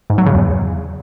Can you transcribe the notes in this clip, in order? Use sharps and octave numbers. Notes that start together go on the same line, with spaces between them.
G#2
F#3
C#3
E2